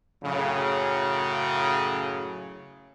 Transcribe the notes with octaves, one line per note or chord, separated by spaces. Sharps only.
F#2 A2 C#3